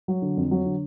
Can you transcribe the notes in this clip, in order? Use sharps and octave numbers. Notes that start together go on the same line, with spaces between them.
F#3
D3
F2
F#3
D3